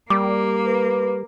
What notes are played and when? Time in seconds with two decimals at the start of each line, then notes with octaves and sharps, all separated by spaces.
0.10 G3 A#3 D6
0.66 B4